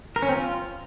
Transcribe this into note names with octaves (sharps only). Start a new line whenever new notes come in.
A#4
C#4
C4
F4